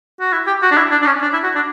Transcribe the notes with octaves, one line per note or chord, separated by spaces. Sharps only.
F#4
E4
G4
F#4
D4
E4
D4
D4
C#4
D4
E4
F#4
D4